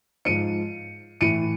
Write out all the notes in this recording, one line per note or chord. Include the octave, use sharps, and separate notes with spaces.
G#2 F3 C#7 D#7
A2 E3 C#7 D#7